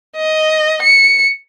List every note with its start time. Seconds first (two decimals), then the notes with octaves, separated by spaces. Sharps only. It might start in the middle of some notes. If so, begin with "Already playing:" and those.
0.16 D#5
0.83 C#7